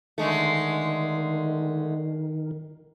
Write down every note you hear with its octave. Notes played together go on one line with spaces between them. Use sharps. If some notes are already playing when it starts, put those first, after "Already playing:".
D3 D#3 G#3 A3